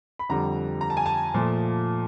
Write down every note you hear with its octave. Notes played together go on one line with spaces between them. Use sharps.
B5
F2 D3 G3 A#5
A#5
A5
G#5
A5
A#2 F3 A3